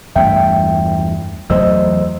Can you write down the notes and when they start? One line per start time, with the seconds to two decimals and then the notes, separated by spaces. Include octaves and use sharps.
0.16 E2 G2 A3 E5 G5
1.50 E2 F#3 A3 C5 D#5 E6